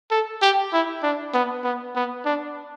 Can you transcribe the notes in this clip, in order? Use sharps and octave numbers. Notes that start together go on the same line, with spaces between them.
A4
G4
E4
D4
B3
B3
B3
D4